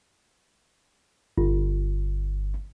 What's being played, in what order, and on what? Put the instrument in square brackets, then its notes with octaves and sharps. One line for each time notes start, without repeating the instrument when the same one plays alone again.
[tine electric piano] G1